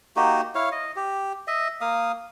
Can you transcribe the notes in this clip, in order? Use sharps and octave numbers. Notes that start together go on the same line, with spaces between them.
A#3 D#4 F#4 G4
E4 C#5 F5
D#5
G4
D#5 E5
A#3 F5 D#6